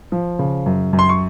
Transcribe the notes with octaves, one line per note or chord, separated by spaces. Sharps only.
F3
C#3
F#2
F#2
C6
C#6